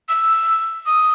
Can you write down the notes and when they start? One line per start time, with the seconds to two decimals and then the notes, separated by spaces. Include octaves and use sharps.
0.09 E6
0.86 D#6